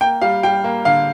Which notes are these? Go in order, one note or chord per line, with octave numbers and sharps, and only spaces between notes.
A#3 G5
G3 F5
G3 G5
A#3
D3 F5